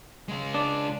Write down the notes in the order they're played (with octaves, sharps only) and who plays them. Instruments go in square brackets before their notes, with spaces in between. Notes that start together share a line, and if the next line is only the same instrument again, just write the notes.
[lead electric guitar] C#3 G#3
[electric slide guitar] D4